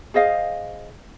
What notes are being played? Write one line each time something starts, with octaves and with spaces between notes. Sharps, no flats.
G#4 C5 D#5 F5